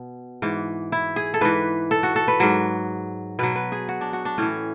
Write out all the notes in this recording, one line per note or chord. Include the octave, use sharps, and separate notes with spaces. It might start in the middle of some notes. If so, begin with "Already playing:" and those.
Already playing: B2
G#2 E3
E4
G#4
A4
G#2 E3 B4
A4
F#4
A4
B4
G#2 F#3
B2 F#3 B4
B4
G#4
F#4
D4
F#4
D4
A2 E3 C#4